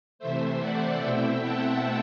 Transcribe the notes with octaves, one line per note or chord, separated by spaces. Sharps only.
C3 E3 A3 C5 E5
D5 F#5
B2 A3 C4 E4 E5 G5
F#5 A5